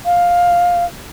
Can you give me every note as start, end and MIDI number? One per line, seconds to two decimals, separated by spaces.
0.05 0.85 77